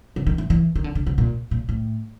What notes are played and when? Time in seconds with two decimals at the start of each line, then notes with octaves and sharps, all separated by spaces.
0.16 C#3
0.27 D#3
0.38 E3
0.50 E3
0.75 D#3
0.84 D3
0.95 D3
1.07 C3
1.18 A#2
1.51 A#2
1.69 A2